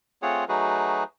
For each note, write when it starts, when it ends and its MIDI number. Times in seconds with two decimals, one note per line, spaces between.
0.22 0.44 57
0.22 0.44 60
0.22 0.44 65
0.22 0.44 68
0.22 0.44 73
0.22 0.44 78
0.49 1.04 54
0.49 1.04 57
0.49 1.04 63
0.49 1.04 66
0.49 1.04 68
0.49 1.04 71